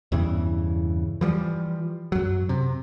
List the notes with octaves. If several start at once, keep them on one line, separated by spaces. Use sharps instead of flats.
E2 G2 C#3 E3
E3 F3 G3
F#2 F#3
C3